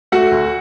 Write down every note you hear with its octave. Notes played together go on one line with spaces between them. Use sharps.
A3 F#4 F#5
D2